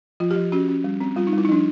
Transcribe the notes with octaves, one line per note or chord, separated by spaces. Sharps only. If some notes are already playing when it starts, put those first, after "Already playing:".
F3 F4
G4
F3
C#4 F#4
C#4
G3
C4
G3 F4
D#4
G3 E4
D#4
F3 D4